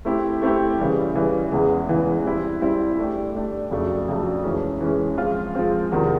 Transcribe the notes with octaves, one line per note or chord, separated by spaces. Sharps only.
A3 C4 E4 G4
A3 C4 E4 G4
C#3 E3 G3
C#3 E3 G3
E2 C#3 E3 G#3
E2 C#3 E3 G#3
G3 C4 E4
G3 C4 E4
A3 D4 G4
A3 D4 G4
F2 C#3 F#3 A3 D4
F2 C#3 F#3 A3 D4
E3 G#3 C#4
E3 G#3 C#4
F3 G#3 C4 F4
F3 G#3 C4 F4
E2 C3 D#3